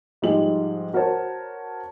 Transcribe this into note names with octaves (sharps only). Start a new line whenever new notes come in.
G#2 F3 G3 G#3 F#7
F#4 A#4 C5 C#5 A5